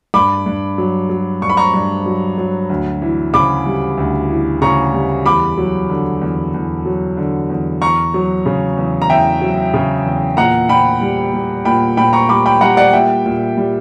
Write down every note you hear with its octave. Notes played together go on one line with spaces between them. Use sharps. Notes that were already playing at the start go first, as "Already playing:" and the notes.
G2 B5 D6
G2
F#3
F#3
G2 C#6
B5
A#5 C#6
G2
F#3
F#3
D2
E3
C#3 B5 D6
G3
D2
E3
C#3 A#5 C#6
G3
E2 B5 D6
F#3
D3
E2
E2
F#3
D3
E2
E2 A#5 C#6
F#3
C#3
E2
A#5
E2 E5 G5
F#3
C#3
E2
A#2 F#5 A#5
A#2 G5 B5
G3
G3
A#2 G5 B5
A#2 G5 B5
A#5 C#6
G3 B5 D6
G5 B5
G3 F#5 A#5
D5 F#5
A#2 E5 G5
A#2
G3